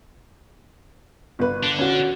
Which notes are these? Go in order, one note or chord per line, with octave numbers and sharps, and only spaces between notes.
G1 B4
D3 D4
C#4 F#4